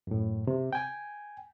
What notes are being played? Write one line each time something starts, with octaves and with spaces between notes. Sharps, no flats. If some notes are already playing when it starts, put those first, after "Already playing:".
F#2 A2
C3
G5 G#5